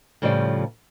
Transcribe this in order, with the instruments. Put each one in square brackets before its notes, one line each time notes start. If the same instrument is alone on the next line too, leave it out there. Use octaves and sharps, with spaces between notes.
[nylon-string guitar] A2 C#3 F3 G3 C5 D5